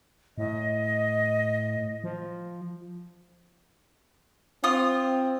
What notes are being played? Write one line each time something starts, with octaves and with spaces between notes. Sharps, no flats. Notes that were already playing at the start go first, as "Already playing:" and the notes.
A2 D#5
F3
C4 F4 D#6